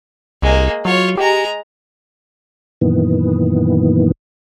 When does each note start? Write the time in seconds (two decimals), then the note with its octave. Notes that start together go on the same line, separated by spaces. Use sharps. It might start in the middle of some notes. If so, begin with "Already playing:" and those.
0.42 C2 G#3 A#3
0.85 F#3 F4 C#5
1.17 G#3 G4 A#5
2.81 F#2 A#2 D#3 E3 B3